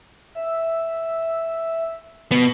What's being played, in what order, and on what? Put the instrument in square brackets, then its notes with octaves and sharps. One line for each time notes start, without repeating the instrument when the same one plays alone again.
[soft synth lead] E5
[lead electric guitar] B2 B3